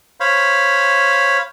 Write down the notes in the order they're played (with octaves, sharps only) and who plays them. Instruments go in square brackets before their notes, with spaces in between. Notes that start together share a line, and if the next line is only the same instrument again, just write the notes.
[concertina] C5 C#5 F5 B5